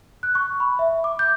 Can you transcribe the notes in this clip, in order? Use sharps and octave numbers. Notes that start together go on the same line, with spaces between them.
F#6
C#6
B5
E5
D6
G6